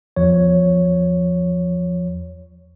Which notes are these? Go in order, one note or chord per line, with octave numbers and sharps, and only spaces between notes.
E2 F3 C#5